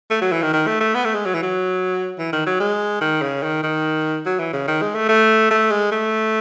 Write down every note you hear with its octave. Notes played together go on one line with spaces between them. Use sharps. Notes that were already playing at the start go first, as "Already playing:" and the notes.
A3
F#3
E3
D#3
D#3
A3
A3
B3
A3
G#3
F#3
E3
F#3
E3
D#3
F#3
G#3
D#3
C#3
D#3
D#3
F#3
E3
C#3
D#3
G#3
A3
A3
A3
G#3
A3